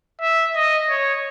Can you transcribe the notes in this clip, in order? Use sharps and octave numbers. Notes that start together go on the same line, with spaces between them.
E5
D#5
C#5